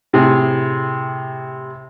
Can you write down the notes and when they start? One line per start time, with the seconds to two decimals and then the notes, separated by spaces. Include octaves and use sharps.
0.13 A2 C3 G#4